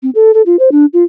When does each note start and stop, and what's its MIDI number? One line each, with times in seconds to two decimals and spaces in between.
0.03 0.10 60
0.15 0.32 69
0.34 0.42 69
0.46 0.56 65
0.59 0.70 72
0.72 0.86 62
0.93 1.04 65